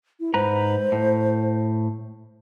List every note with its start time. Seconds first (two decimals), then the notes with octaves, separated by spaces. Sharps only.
0.20 E4
0.34 G#2 B4 C5 A#5
0.92 A2